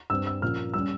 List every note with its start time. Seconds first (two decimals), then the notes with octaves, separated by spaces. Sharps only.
0.10 G2 G3 C4 E6
0.27 E6
0.42 A#2 F3 A#3 C#4 F6
0.74 G3 C#4 E6